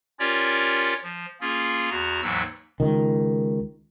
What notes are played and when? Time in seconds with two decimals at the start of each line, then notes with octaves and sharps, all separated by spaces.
0.19 C#4 F4 G4 A#4 C#5 D5
1.03 F3
1.41 A#3 C#4 F4 G#4
1.90 E2 F#4 A#5
2.23 D#2 G#2 E3 F#3 E6
2.80 C#2 D#3